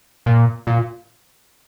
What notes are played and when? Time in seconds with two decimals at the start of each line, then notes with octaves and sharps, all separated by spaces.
0.26 A#2
0.67 A#2